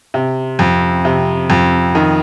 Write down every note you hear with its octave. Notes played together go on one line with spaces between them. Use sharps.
C3
F2
C3
F2
D#3